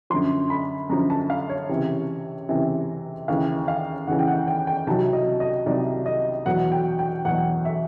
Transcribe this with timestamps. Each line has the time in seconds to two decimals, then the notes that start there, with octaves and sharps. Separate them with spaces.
0.10 F#2 D3 F3 C6
0.50 B5
0.90 F#2 D3 F3 A#5
1.10 A5
1.30 F5
1.50 C#5
1.69 C#2 C3 E3
2.49 C#2 C3 E3
3.28 D#2 C#3 E3 F5
3.68 F5
4.07 D#2 C#3 E3 F#5
4.19 G5
4.27 F#5
4.48 G5
4.67 G5
4.87 C2 C3 D#3 F#3 A5
5.13 D#5
5.40 D#5
5.66 C2 C3 D#3 F#3 D5
6.06 D#5
6.46 E2 B2 F#3 F#5
6.72 G5
6.99 G5
7.25 E2 B2 F#3 F#5
7.65 E5